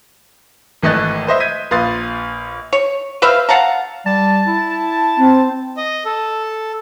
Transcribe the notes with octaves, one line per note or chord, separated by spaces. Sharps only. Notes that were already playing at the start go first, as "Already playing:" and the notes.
G#1 E3 A3 D#5 F#6 A6
B4 C5 D#5 E5
G6 G#6 B6 D#7
A#1 B4 F5 C6 D#6 A6
C#5
B4 C5 E5 F5
F5 F#5 A5 A#5
G3 A5
E4
C4
D#5
A4